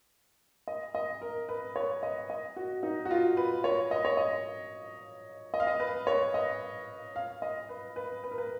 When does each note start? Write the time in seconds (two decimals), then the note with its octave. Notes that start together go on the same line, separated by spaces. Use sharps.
0.67 D#5
0.95 D#5
1.21 A#4
1.49 B4
1.76 C#5
2.03 D#5
2.30 D#5
2.56 F#4
2.83 D#4
3.05 F#4
3.11 F4
3.37 B4
3.64 C#5
3.91 D#5
4.05 C#5
4.17 D#5
5.54 D#5
5.60 F5
5.67 D#5
5.80 B4
6.07 C#5
6.34 D#5
7.16 F5
7.42 D#5
7.69 B4
7.96 B4
8.24 B4
8.31 A#4
8.38 B4